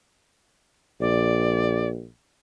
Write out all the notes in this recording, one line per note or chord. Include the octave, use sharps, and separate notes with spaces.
A#1 D5